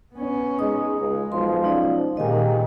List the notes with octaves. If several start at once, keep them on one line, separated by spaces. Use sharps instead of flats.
B3 C#4
G#3 D#4 D#6
C#2 G#3
B1 F3 C6
C#4 D#4 D5
A#2 D#3 G#3 A#3 G4 D#5 G#5